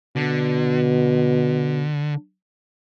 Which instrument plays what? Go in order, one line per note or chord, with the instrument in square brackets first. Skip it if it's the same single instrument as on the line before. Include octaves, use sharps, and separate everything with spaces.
[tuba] B2 [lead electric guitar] D3